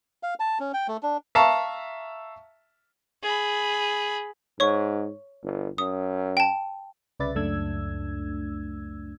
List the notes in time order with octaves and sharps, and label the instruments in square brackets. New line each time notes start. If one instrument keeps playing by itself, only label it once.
[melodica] F5
A5
C#4
G5
A3
D4
[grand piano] E5 F5 A5 A#5 C#6
[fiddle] G#4 B5
[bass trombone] G#2 [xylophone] C#5 C#6
[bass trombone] G1
[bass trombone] F#2 [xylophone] D#6
[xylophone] G5 A5
[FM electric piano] C2 C#3 B4 D5 E5 A6
C#2 F#2 A3 D4 E6 G#6